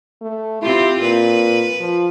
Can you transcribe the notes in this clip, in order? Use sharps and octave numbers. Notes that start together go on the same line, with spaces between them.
A3
C4 E4 F4 G4
A#2 B4
F3